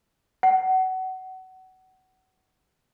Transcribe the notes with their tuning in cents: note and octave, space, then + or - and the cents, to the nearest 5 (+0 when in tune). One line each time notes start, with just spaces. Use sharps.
F#5 +25